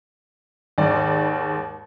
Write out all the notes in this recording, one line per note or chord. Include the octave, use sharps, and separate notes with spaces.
D#2 G#2 D5